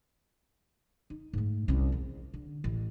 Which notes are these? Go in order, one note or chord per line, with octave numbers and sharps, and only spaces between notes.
D#4
G#2 A3
C2 C#4
E2
D3
A1